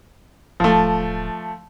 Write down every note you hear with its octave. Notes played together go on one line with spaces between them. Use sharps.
D1 F3 A3